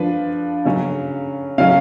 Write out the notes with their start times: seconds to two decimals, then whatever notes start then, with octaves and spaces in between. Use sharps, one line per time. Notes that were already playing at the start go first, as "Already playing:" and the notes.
Already playing: F3 D4 B4
0.65 C#3 F#3 C#4
1.58 C#3 F#3 C#4 F5